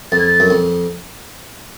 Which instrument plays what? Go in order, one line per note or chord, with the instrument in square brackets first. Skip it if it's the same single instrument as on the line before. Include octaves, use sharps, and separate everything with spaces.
[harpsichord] F2 [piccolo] A6
[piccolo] G#6
A6
[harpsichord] F#2
F2